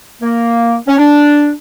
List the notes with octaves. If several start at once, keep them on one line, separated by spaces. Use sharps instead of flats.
A#3
C#4
D4